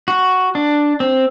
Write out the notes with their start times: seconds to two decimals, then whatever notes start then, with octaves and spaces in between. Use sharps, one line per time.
0.08 F#4
0.55 D4
1.00 C4